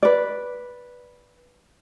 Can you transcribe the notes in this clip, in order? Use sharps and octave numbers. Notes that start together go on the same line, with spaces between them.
B4 D5